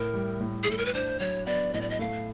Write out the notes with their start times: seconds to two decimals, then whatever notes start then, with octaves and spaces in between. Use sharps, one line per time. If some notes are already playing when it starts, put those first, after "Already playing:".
Already playing: A2 A#4
0.14 G3
0.41 A2
0.63 G#4
0.67 A2 A4
0.78 A#4
0.85 B4
0.94 D4 C5
1.20 F#3 C#5
1.46 B3 D5
1.73 A2 D#5
1.81 D5
1.90 D#5
1.99 A3 F5